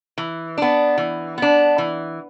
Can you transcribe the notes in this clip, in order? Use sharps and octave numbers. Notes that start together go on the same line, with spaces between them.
E3
B3 D4
E3
B3 D4
E3